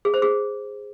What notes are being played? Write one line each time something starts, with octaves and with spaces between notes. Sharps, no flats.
G#4
C5
G#4